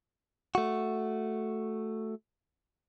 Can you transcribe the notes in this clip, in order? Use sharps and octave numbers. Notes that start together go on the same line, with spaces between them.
A3 F#4